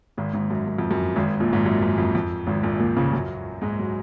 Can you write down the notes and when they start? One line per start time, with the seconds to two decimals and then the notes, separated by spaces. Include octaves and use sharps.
0.18 G#1 G#2
0.33 G#1 G#2
0.50 F#2
0.67 F#2
0.79 F2
0.91 F#2
1.16 G#1 G#2
1.40 A#1 A#2
1.52 G#1 G#2
1.66 F#2
1.82 F#2
1.98 F2
2.15 F2
2.47 G#1 G#2
2.63 A#1 A#2
2.79 A#1 A#2
2.97 C#2 C#3
3.12 F#2 F#3
3.62 G#2 G#3
3.79 F#3